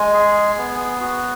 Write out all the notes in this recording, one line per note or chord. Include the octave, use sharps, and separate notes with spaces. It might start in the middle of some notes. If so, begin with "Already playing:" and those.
Already playing: G#3 G#5
G#4
B3
F#4